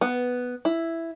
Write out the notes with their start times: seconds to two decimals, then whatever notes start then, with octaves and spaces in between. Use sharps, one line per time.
0.01 B3
0.65 E4